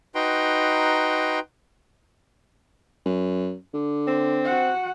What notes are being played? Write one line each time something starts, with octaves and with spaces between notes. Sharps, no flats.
D#4 F#4 B4 G5 A#5 C6
F#2
D3
C4
F#4 F#5